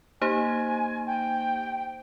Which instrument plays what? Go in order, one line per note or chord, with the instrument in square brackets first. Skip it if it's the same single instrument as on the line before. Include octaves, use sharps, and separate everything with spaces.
[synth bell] A#3 D#4 G4 C5 [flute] G#5
[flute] G5